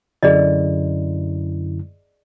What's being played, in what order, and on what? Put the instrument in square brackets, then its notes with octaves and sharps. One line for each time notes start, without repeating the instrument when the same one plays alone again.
[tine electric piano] F#2 D3 E4 [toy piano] G#4 D5 D#5